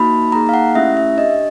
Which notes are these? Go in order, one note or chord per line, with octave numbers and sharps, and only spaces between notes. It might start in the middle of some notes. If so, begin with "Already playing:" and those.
Already playing: A#3 D#4 F#4 B5
A#3 D#4 G#4 A#5
F5
F#5
A3 C#4 E4 G4 E5
E5
D4 G4 D#5